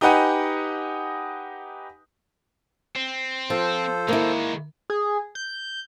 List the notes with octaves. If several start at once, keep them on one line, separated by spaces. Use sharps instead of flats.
D#4 G4 B4 D#5 F#5 G#5
C4
F3 A4 C5
D#3 G#3 A#3 E4
G#4
G6